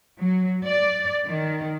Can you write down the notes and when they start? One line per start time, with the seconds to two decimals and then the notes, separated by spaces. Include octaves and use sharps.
0.19 F#3
0.66 D5
1.27 D#3